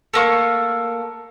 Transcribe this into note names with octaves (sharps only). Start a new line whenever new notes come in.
A3 A#3 C#6